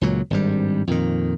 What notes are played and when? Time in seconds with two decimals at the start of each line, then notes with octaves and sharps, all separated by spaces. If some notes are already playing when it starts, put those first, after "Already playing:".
0.01 C#2 A#2 F#3
0.30 G#1 G2 G3
0.87 F2 A#2 D#3